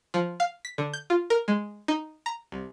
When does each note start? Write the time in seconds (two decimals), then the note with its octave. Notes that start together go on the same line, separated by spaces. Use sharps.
0.14 F3
0.40 F5
0.65 B6
0.78 D3
0.93 G6
1.10 F4
1.30 A#4
1.48 G#3
1.88 D#4
2.26 A#5
2.52 C2